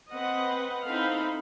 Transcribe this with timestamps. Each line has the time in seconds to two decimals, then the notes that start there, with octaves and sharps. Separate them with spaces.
0.13 C4 B4 D#5 F#5
0.87 C4 D#4 E4 A4 F5 B5